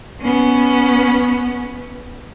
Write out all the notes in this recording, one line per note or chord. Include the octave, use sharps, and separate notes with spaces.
B3 C#4